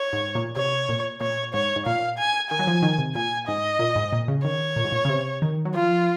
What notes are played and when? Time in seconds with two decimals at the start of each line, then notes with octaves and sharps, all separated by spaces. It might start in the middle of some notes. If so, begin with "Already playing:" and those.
Already playing: C#5
0.13 G#2
0.35 A#2
0.56 C3 C#5
0.89 A#2
1.21 A#2 C#5
1.54 G#2 C#5
1.76 G#2
1.86 A#2 F5
2.18 G#5
2.50 D#3 G#5
2.59 F#3
2.67 F3
2.82 D#3
2.98 C3
3.15 A#2 G#5
3.47 G#2 D#5
3.79 A#2
3.96 G#2
4.13 A#2
4.28 C#3
4.44 D#3 C#5
4.76 A#2
4.84 G#2
4.92 A#2
5.05 C#3
5.09 C3
5.42 D#3
5.65 F#3
5.74 F3 F4